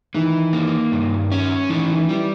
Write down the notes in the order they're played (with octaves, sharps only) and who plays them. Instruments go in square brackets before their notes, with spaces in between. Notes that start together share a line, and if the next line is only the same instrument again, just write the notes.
[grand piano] D#3 [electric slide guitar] E3
[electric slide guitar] A#3
G2
C#4
[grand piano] D#3 [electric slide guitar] E3
[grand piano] D#3
[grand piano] E3 [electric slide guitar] G3